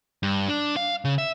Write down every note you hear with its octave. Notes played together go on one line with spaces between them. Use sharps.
G2
D4
F5
C#3
E5